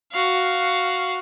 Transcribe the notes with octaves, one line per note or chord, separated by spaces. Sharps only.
F#4 F5